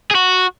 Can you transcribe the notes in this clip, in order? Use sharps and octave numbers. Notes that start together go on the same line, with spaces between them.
G#4
F#4